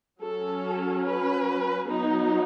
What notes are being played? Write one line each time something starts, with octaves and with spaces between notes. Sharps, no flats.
F#3 C#4 A4
B4
F#3 B3 D#4